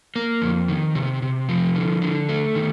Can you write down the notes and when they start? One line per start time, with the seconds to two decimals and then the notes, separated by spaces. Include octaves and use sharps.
0.16 A#3
0.42 F2
0.68 D#3
0.95 C3
1.22 C3
1.49 F3
1.76 D3
2.02 D3
2.29 A3
2.55 D#3